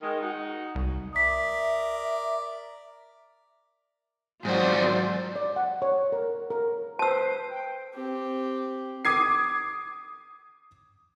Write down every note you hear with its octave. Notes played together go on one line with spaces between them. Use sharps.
D#3 G#3
D#4 F#4
C2
A#4 D5 E5 D#6 B6
G#2 F#3 F4 F#4 C5 D5 C6
D5
F#5
C#5
A#4
A#4
B4 C5 A5 E6
G5
C4 G4
D6 D#6 G#6 C7